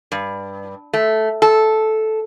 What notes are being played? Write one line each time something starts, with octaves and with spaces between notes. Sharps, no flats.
G2
A3
A4